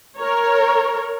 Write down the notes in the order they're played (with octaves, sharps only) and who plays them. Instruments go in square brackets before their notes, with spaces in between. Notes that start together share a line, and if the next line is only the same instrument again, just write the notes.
[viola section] A#4 C#5